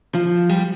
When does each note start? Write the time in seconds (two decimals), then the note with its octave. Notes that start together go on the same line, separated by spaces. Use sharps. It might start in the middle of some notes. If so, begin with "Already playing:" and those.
0.15 F3
0.49 G3